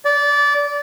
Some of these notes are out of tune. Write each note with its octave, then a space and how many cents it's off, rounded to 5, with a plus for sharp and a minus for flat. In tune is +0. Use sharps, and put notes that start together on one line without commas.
D5 -20